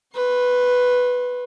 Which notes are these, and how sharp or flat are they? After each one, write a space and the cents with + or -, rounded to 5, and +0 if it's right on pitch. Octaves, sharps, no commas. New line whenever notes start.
B4 +0 C6 +35